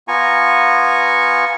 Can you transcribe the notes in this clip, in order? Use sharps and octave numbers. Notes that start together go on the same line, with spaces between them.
B3 F4 G#5 A#5 C#6